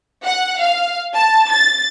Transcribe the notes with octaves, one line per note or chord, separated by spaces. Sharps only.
F#5
F5
A5
A6